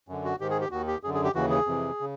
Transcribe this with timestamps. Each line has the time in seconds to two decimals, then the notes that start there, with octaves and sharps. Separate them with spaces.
0.08 F#2 D3
0.25 F#4
0.40 G#2 D#3 G4
0.50 G#4
0.61 G4
0.71 D#2 D#3 F#4
0.87 G4
1.03 F#2 D3 G#4
1.14 G#4
1.24 G4
1.35 D#2 C#3 E3 F#4
1.50 G#4
1.66 F2 C3 E3
2.00 C#3